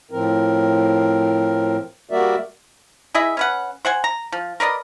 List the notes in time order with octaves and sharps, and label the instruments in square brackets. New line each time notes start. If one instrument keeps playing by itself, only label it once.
[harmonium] A2 F3 C4 A#4
G3 A#3 F#4 A#4 D5 E5
[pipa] E4 G#4 D#5 E5
C#4 B4 F#5
C5 F#5 G#5
A#5
F3
A#4 B4 D5 D#5